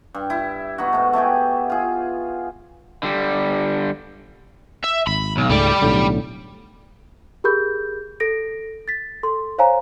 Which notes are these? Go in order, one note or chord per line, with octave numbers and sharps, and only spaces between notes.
G2
E4
B3 D#4 F#4
G#2 A3
A3 E4 G4 G#4
F4 G#4
D3 G3
E5
G#1 B5
B1
C#2 G#2 G3 A3 D5
B1 A2 D3
G4 G#4 A#4 B5 G6
A4 A#6 D7
A6 B6
A4 C6
C5 C#5 F5 G#5 A#5